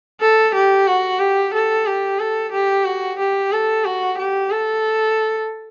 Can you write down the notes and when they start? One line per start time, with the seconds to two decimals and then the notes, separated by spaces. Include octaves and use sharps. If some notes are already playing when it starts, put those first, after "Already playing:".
0.21 A4
0.54 G4
0.87 F#4
1.20 G4
1.54 A4
1.86 G4
2.19 A4
2.52 G4
2.85 F#4
3.19 G4
3.52 A4
3.85 F#4
4.18 G4
4.51 A4